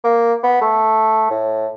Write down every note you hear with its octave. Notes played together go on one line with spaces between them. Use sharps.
A#3
B3
A3
A2